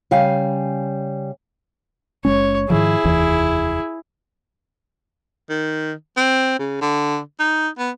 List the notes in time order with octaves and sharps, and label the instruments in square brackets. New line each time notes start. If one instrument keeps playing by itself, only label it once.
[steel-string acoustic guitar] C#3 G3 F5 G5 G#5
[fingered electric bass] F#1 G#3 C#4 [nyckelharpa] C#5
[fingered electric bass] G#2 D#3 F3 [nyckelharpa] E4 G#4
[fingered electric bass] F1 D#2 E3
[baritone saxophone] D#3
C4
C#3
D3
D#4
B3